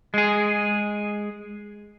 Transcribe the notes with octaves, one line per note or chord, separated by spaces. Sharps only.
G#3 G#4